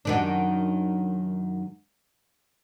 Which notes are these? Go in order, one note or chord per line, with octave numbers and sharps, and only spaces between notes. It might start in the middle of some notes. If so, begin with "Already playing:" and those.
F#2 D#3 D4